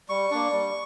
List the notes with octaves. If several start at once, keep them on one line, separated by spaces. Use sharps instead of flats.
G3 C#6
A#3 D4
G3